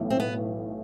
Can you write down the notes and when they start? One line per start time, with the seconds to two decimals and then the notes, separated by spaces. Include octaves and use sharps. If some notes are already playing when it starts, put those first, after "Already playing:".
Already playing: B1 A2 E3
0.10 C4
0.20 B3